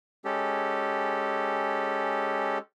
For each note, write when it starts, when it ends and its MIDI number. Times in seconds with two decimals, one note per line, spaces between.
0.25 2.58 56
0.25 2.58 61
0.25 2.58 67
0.25 2.58 69